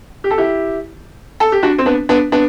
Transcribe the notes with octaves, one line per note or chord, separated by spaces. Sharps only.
G4
A4
E4 G4
A4
G4
D4 F#4
C4
B3 D4
B3 D4
B3 D4